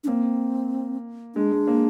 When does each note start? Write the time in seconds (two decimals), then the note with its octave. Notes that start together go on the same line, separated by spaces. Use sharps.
0.04 D4
0.07 A#3 C4
1.35 G#3 D4
1.52 G#3
1.67 A#3